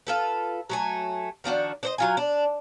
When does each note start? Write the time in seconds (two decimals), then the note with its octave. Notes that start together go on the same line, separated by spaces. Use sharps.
0.07 F4 A4 B4
0.70 F#3 A3 G#5
1.44 D#3 F3 D4 F#4
1.83 D4 C5 D#5
1.98 F#3 F4 G#5
2.17 D4